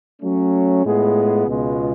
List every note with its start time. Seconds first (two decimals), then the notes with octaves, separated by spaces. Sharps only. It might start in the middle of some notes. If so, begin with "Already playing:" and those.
0.22 F#3 A3 C#4
0.85 A2 G#3 B3 F4 G#4
1.47 C#2 B2 G#3 B3 F4